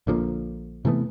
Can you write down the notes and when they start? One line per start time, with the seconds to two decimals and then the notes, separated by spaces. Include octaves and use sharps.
0.07 A#1 D3 F3 A#3
0.85 C3 E3 A3 B3